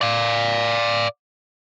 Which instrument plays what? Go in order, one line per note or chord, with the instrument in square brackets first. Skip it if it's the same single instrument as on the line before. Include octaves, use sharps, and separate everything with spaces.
[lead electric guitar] D5 F5